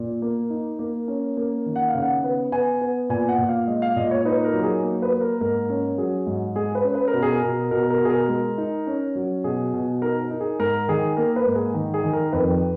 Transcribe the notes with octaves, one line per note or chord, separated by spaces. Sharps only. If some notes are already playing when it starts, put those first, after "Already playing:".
Already playing: A#2
A#3
D#4
A#3
C#4
A#3
D#3
F#5
F5
C#3
F#5
B3
B3 G#5
B3
A#2 G#5
F#5
A#2
F5
G#3 D#5
F5
A#2 D#5
C#5
D#4 B4
A#4
F#3
G#4
A#3
B4
A#3
A#4
G#2 A#4
C#4
F#3 G#4
G#2
G#3 G#4
B4
C#4
B4
A#4
B2
G#4
A#4
B2
B2 A#4
A#4
B2
G#4
A#4
G#3
D#4
C#4
F#3
B2 G#4
B2
D#4 A#4
A#4
D#4
G#4
G#2 A#4
D#3 G#4
A#3 A#4
B4
G#2
G#4
D#3
G#4
D#3
A#4
F2 B4